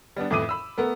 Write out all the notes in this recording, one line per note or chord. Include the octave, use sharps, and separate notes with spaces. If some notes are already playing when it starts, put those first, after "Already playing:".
G3 B3 D4
F2 A2 E3 D6 D#6 D#7
B5 E6
A3 B3 A#4